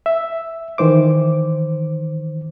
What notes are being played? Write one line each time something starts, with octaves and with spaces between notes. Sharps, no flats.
E5
D#3 E3 C5 D6